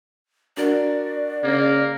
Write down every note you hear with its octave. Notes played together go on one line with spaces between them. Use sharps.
D4 F#4 A#4 D5
C#3 A#3